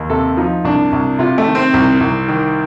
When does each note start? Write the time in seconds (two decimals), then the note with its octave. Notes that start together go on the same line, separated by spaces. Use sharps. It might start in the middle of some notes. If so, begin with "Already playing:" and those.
Already playing: D#2
0.10 C3 A4
0.37 F3 D#4
0.64 C2 D4
0.92 C2
1.19 C3 F4
1.38 A3
1.46 D#3
1.55 C4
1.74 C2
2.00 C2
2.28 D#3